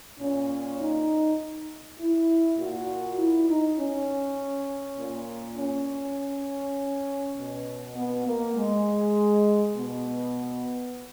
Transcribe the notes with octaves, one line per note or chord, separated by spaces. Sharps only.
A#2 C#4
D#4
E4
A#2 F#4
E4
D#4
C#4
A#2
C#4
B2
B3
A#3
G#3
B2 B3